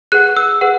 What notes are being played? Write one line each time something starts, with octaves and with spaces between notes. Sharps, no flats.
G#4 B4 F#5 F#6
E6
G#4 B4 F#5